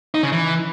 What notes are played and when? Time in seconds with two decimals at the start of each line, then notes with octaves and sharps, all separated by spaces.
0.14 D#4
0.23 C#3
0.32 E3